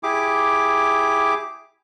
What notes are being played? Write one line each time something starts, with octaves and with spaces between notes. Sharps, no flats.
E4 G4 G#4 D6